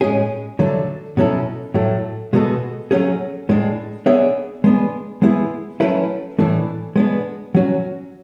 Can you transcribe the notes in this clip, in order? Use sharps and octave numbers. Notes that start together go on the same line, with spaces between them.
A2 G#3 C#4 G#4
D3 F#3 A3 D4
B2 F#3 C#4 E4 A4
A2 F#3 A3
B2 G#3 B3 F#4 A4
F#3 A3 C#4 G#4
A2 G#3 D4
B3 D4 G#4 C#5 E5
G#3 B3 D4
G#3 B3 E4 G#4
F#3 A3 C#4 E4 B4
A2 E3 A3 D4
G#3 B3 D4
F#3 C#4 F#4